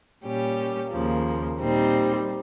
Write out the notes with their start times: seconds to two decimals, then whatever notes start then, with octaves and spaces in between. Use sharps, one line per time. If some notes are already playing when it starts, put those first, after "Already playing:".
0.23 A#2 G3 C#4 G4
0.90 D#2 C#3 F3 A#3
1.59 A#2 G3 C4 D#4